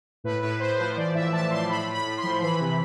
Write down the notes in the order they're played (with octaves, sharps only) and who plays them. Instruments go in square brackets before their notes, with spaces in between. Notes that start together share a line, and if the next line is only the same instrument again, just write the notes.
[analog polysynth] A2 B4
A2 B4
A2 C5
F3 C5
E3 D5
A2 E5
E3 A5
A2 C6
A2 B5
A2
B5
A2
C6
F3
E3 B5
C3